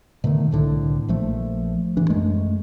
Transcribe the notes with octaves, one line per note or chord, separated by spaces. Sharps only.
B2 D3 D#3 A3
C2 A2 D3
A#1 F3 A3
A1 E3 D4
F#2 G#3 A3